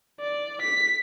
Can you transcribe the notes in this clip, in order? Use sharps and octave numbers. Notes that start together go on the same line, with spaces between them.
D5
B6